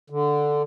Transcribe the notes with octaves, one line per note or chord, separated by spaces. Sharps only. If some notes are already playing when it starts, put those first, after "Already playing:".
D3